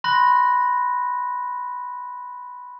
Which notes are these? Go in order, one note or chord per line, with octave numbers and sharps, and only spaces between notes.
B5 C6 F#6 A#6